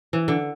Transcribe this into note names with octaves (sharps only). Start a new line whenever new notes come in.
E3
D3